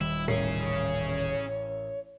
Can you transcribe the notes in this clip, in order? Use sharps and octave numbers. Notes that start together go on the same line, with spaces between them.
D#1 D#3 G3 E4
A1 C#4 G#4 A#4 C#5 C7